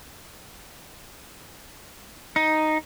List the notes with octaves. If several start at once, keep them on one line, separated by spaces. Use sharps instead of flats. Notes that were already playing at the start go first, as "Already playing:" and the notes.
D#4